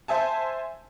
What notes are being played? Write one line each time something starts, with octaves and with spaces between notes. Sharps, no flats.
C5 E5 G#5 A5